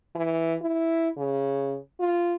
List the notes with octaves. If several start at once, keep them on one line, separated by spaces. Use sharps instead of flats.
E3
E4
C#3
F4